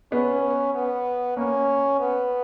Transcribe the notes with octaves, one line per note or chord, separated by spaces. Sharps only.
B3 C#4
B3
A#3 C#4
B3